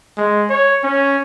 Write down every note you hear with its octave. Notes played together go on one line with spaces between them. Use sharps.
G#3
C#5
C#4